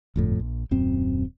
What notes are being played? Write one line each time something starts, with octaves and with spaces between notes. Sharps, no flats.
G1 F2 A2
A#1
D#1 F#2 C4